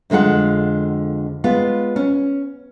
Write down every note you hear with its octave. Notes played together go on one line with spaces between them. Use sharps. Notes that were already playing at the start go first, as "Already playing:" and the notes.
F2 D3 G#3 F4 F#5
G#3 B3 F4
C#4